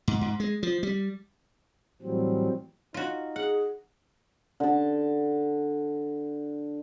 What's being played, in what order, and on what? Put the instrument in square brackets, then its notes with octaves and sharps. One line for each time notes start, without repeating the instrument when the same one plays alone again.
[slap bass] G#2
G#2
G#3
F3
G3
[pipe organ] A2 E3 F#3 G3 C4
[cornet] D#4 [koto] F4 F#4
[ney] G#4 [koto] F#5
[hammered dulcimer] D3 A5